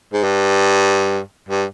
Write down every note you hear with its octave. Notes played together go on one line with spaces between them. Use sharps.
G#2
G2
G2